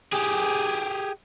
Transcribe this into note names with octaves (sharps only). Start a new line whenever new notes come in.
G4 G#4